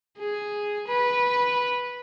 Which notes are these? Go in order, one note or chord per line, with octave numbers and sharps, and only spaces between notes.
G#4
B4